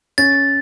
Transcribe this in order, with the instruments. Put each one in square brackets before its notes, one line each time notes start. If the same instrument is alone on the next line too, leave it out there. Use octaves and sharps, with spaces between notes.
[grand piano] C#4 [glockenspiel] A6